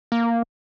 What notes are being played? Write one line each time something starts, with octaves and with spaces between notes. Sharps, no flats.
A#3